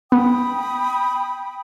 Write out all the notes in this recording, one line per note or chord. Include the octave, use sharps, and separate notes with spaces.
B3 G5 B5 D#6